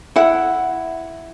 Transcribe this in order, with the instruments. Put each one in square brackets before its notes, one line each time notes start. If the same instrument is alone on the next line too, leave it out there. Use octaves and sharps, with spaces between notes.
[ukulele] E4 F#5